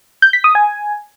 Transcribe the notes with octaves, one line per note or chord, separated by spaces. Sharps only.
G6
B6
D#6
G#5